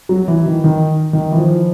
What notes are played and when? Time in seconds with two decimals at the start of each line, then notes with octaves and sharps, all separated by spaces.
0.09 F#3
0.28 E3
0.46 D#3
0.64 D#3
1.13 D#3
1.32 E3
1.38 F3